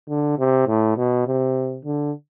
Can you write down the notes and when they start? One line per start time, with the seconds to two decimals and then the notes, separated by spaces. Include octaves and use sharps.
0.09 D3
0.39 C3
0.68 A2
0.97 B2
1.27 C3
1.85 D3